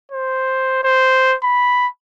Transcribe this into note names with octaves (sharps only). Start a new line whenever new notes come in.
C5
C5
B5